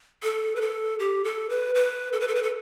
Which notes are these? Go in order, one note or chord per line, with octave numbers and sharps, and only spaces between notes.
A4
B4
A4
G4
A4
B4
B4
A4
B4
A4
B4
A4